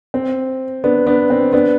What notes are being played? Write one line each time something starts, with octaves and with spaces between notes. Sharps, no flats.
C4
B3 D4
B3 D4
C4
B3 D4